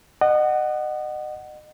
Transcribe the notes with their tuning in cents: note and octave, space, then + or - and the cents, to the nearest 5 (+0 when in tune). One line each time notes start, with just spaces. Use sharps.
D#5 -35 F#5 +10